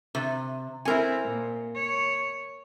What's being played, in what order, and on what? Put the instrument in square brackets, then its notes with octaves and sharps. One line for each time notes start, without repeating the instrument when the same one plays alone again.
[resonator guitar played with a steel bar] C3
[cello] C4 E4 [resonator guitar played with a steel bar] A#4 G#5
[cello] A#2
C#5